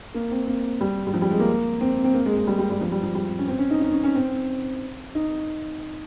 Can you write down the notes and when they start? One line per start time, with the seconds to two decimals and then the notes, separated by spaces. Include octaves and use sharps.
0.14 A#3
0.31 C4
0.47 A#3
0.81 G3
1.07 G3
1.14 F3
1.22 G3
1.30 G#3
1.39 A#3
1.81 C4
2.04 C4
2.14 A#3
2.26 G#3
2.36 G#3
2.47 G3
2.59 G3
2.70 G3
2.81 F3
2.92 G3
3.03 F3
3.15 G3
3.39 C#4
3.48 C4
3.59 C#4
3.71 D#4
3.81 D#4
3.92 C#4
4.04 C#4
4.15 C4
5.15 D#4